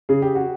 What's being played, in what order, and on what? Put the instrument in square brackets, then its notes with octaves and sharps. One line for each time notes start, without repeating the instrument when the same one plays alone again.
[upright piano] C#3 G#4
G4
F#4